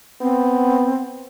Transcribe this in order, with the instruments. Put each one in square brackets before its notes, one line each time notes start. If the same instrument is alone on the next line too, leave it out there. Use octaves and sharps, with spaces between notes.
[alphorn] B3 [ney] C4